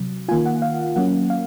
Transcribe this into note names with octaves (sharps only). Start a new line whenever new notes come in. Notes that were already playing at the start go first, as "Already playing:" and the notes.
Already playing: C3 F#3
D#3 A#3 F4 G#5
F#5
F5
F#3 A#3 C#4 F#5
F5